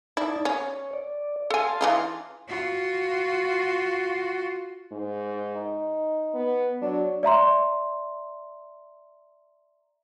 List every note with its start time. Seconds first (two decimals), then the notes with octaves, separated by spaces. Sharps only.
0.17 D#4 E4 D5 A5
0.45 C#4 C#5
0.93 D5
1.50 A4 F5 G#5 A5 C6
1.81 E3 D#4 F4
2.48 F4 F#4
4.92 G#2
5.55 D#4
6.34 B3
6.82 F#3 D4
7.23 D5 E5 A#5 C6